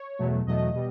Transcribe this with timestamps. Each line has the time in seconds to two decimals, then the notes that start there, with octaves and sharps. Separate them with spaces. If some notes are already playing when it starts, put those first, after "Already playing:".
Already playing: C#5
0.19 E2 B2 F#3 A3
0.47 E2 B2 F#3 A3 D#5
0.74 B2 G3